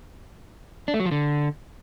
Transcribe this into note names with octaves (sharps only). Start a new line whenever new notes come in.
D4
A3
F#3
F3
D3